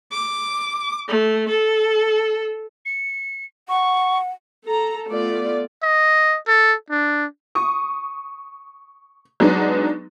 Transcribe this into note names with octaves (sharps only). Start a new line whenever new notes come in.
D6
A3
A4
C#7
F#5 C#6
A4 A#5
A3 B3 F4 D5
D#5
A4
D4
C#6 D#6
F#3 G#3 B3 D4 D#4